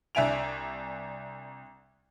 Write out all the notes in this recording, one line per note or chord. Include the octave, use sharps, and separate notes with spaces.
C2 D4 E5 G#5 D7 F7